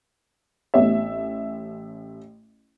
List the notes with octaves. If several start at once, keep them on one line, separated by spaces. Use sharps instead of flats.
A1 B3 G4 C#5 E5